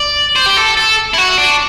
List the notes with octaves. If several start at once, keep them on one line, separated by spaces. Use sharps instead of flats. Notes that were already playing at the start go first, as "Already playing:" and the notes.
Already playing: D5
C5
G4
A4
A4
E4
F#4
D4